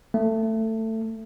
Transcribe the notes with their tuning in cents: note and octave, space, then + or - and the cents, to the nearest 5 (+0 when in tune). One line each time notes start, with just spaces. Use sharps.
A3 +20